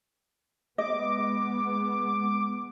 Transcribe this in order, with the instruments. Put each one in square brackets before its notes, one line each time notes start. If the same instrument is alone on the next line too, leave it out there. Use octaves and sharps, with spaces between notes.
[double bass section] G#3 B3 [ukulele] D#5 [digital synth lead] D6